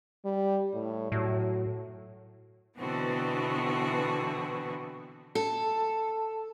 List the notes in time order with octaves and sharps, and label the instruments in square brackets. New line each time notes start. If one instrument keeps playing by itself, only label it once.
[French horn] G3
A2
[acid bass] A2 [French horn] F#3
[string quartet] B2 D3 E3 B3 C4 F#4
[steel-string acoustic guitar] A4